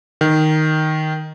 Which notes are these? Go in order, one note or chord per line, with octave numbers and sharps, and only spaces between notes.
D#3